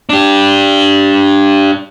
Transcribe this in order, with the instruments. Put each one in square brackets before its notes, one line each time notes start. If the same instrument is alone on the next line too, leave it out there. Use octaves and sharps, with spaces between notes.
[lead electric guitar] D4 G4